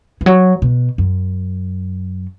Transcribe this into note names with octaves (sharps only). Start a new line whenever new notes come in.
E3
F#3
B2
F#2